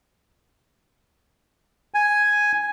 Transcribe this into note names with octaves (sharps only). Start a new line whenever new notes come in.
G#5